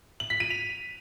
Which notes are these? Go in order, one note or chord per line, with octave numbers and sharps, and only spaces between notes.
F#7
B6
D#7
F7